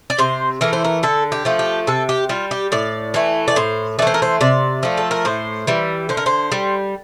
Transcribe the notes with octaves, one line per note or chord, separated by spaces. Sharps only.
D5
C3 C5
E3 A3 A#4
C5
A#4
D3 A4
G4
F3 A3
G4
C3 A4
G4
G3 F4
G4
A2 D5
E3 A3
D5
A2 C5
E3 A3 C5 D5
A#4
C5
C3 D5
F3 A3
A4
A#4
A2 C5
E3 G3
D3 C5
A#4
C5
G3